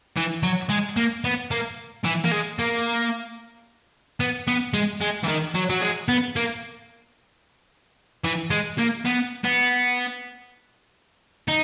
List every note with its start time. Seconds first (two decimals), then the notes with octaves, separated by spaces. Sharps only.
0.17 E3
0.43 F#3
0.70 G#3
0.97 A#3
1.24 B3
1.51 A#3
2.04 E3
2.24 A#3
2.31 G#3
2.59 A#3
4.20 B3
4.47 B3
4.74 G#3
5.01 G#3
5.24 E3
5.28 D#3
5.55 F#3
5.70 F#3
5.81 G#3
6.08 B3
6.36 A#3
8.25 E3
8.51 G#3
8.78 A#3
9.05 B3
9.45 B3
11.48 D#4